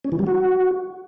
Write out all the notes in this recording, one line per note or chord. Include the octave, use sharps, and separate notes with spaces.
C#4
E3
G3
F#4